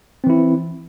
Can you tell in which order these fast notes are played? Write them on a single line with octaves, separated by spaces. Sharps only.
C4 E3 E4